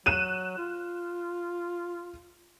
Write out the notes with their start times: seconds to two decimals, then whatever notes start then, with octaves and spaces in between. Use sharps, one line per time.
0.06 F#3 F#6 D#7 E7
0.58 F4